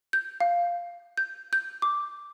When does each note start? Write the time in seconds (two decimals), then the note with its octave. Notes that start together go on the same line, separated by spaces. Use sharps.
0.13 G6
0.40 F5
1.17 G6
1.53 G6
1.82 D6